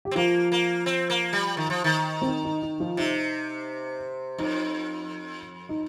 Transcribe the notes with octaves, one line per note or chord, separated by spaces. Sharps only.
G4
C4
F3 A#3 F4
A#3
C4
A#3
G3
D#3
F3
D#3
C4
D#4
D#4
D#4
F3 F4
C3 D#4
F2 D#4
D#4